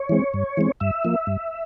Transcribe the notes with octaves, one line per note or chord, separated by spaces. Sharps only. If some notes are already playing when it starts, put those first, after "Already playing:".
Already playing: C#5
E3 G#3 C4
G2
E3 G#3 C4
G2 E5
F3 A#3
G2